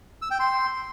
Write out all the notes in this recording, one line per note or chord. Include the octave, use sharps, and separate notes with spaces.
E6
G5
C6